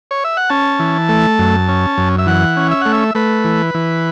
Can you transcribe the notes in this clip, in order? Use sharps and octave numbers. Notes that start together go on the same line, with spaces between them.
C#5
E5
F#5
C#4 A5
E3
A3
F#2
C#4
F#2
E5
E3 F#5
C#4
E5
A3 F#5
E5
A3 B4
E3
E3